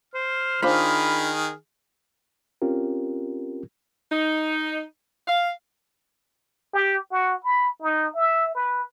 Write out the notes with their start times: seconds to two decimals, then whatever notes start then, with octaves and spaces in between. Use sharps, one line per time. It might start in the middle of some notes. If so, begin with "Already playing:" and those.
0.14 C5 F6
0.62 D#3 D4 F4 G#4 C5 B5
2.62 C4 C#4 F4 G4 A#4
4.11 D#4
5.27 F5
6.73 G4
7.11 F#4
7.44 B5
7.82 D#4
8.15 E5
8.55 B4